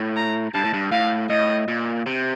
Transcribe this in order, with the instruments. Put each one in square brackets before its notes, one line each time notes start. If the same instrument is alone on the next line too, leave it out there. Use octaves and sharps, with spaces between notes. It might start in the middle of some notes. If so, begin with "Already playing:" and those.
Already playing: [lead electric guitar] A2
[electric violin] A#5
[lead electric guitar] G2 [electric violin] A5
[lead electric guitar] A2
G2
[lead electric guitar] A2 [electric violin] F5
[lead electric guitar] A2 [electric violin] D#5
[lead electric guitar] A#2
C3